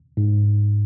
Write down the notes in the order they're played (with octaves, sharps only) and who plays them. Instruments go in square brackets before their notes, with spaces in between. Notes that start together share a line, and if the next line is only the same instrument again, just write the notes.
[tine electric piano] G#2